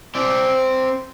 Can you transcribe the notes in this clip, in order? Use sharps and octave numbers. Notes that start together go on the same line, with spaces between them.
C4 D5